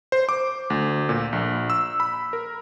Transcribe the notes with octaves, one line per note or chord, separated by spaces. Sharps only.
C5
D6
D2
A#2
A#1
E6
B5
A#4